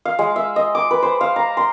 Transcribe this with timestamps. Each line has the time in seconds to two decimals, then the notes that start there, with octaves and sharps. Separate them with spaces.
0.05 F5
0.19 G#3
0.36 E5
0.56 D#5
0.75 D6
0.91 B4
1.03 C5
1.21 F5
1.36 A#5
1.57 C6